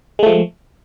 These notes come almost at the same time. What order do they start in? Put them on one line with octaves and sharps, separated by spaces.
G#3 A3 F3